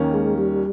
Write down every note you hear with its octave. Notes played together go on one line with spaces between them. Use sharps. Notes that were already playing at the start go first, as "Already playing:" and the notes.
Already playing: D#2 D#3 A#3 C#4
G#3
G3